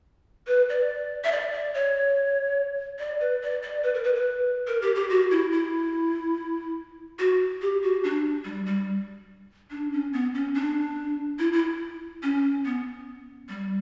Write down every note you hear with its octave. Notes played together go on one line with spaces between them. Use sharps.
B4
D5
E5
D5
D5
C#5
D5
B4
D5
D5
B4
A#4
B4
B4
A#4
G4
G4
F#4
E4
E4
F#4
G4
F#4
D4
G3
G3
D4
C#4
B3
C#4
D4
E4
E4
C#4
B3
G3